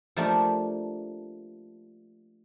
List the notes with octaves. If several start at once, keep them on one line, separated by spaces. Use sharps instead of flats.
F3 A3 A#3 D4 G4